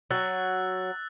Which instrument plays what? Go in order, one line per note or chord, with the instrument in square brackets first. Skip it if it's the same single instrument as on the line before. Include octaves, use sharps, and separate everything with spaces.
[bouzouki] F#3 [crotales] E6 F#6 A6